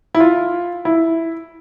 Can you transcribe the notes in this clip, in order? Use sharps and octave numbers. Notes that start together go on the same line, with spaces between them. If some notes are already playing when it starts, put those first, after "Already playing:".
E4
F4
E4